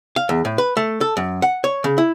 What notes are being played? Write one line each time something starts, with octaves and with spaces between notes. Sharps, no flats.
F5
E2
A2
B4
A3
A4
F#2
F#5
C#5
C#3
E4